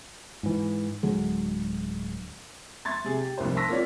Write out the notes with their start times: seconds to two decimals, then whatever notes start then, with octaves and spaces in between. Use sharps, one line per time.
0.43 G#2 E3
1.03 D1 D3 F#3 G#3
2.85 E5 C6 C#6 G#6 A6
3.04 C3 G#4
3.21 G4
3.38 F1 C2 G2 A#3 C5
3.56 A5 C6 C#6 E6 A#6 B6
3.69 A#3 C4 F4 C#5 D5